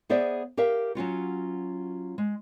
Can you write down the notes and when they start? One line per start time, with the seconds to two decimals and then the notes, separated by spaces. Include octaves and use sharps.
0.10 B3 G#4 C5 D5 E5
0.57 G4 A#4 E5 F5
0.95 F#3 C#4 F4 F#4
2.18 G#3